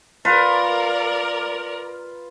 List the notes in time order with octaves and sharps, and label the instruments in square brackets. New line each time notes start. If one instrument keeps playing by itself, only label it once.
[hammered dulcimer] F4 B4 [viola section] A#4 D5